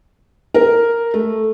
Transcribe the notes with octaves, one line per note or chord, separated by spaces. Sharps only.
A#4
A3